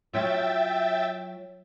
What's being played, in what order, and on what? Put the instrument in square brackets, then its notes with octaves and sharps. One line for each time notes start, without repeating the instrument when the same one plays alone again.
[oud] F#3 C#4 F4 [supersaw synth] E5 G5 A6